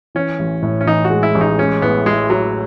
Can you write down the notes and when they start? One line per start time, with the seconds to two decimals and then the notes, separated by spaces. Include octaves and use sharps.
0.15 E3 C#4
0.39 A1
0.62 A2
0.81 C#4
0.86 E3 D#4
1.05 F#4
1.10 G#3
1.23 E4
1.35 A1
1.41 D#4
1.59 G#3 C#4
1.82 A2 B3
2.06 G#3 E4
2.30 F#3 E4